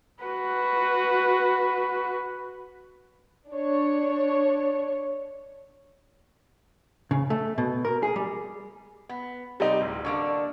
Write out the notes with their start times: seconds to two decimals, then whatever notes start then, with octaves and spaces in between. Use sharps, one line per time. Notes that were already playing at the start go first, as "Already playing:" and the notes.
0.24 F#4 B4
3.50 D4 C#5
7.11 C#3
7.30 A3
7.58 B2
7.85 A#4
8.03 G#4
8.16 G3
9.09 B3
9.60 C3 G3 C4 D#4
9.81 D1
10.05 D3 A#3 D4 C#6